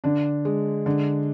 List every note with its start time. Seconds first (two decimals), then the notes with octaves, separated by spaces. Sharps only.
0.04 D3 D4
0.45 G#3
0.86 D3